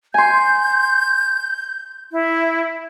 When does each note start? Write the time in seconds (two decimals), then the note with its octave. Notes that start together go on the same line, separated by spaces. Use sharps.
0.14 G#5 C6 G6
2.12 E4